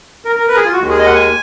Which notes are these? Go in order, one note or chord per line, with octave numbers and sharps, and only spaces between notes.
A#4
A#4
B4
A#4
G#4
F4
F#4
D#2 D#3 G#3
G#4
D#5
F#5
G#5